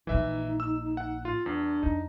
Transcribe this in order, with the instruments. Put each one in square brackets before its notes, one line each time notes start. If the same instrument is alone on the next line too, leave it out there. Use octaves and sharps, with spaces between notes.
[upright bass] A#1 A#2 [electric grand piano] E3 E5 [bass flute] D#4
[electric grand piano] E6
F#5
F4
[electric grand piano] E2 [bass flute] D4
[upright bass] F2 [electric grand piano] D#4